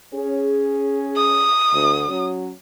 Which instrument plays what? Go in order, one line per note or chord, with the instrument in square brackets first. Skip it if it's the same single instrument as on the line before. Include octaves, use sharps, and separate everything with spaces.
[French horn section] C#4 G#4
[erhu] D#6
[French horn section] D2
F#3 C#4